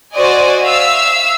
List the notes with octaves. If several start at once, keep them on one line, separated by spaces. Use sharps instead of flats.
F#4 C5 D5 D#5 G#5
E5 F5 E6